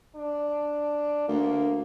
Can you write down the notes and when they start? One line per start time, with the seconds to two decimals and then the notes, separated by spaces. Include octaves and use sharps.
0.16 D4
1.28 D2 A#3